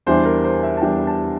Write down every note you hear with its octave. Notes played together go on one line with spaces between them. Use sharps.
E2 E3 G3 D4 C5
A#4
C5
E5
A5
E2 E3 G3 D4 G5
A5